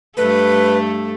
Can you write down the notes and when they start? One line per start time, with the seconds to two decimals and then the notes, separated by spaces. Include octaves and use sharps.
0.17 G2 A3 A4 B4